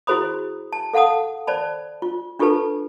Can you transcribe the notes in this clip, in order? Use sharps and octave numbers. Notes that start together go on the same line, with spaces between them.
E4 F#4 G#4 C5 B5 D#6
A5
A4 F5 F#5 A5 D#6
C5 D5 A5 B5
F4
D4 F4 G4 A4 B4 A5